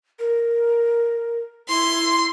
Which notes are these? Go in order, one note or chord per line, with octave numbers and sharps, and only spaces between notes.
A#4
E4 C6